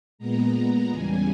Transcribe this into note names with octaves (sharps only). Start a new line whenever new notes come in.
A#2 G#3 B3 A#5
E2 C#3 G3 G#5